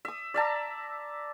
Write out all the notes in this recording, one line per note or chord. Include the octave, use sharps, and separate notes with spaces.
E5 D#6
D5 E5 A5 A#5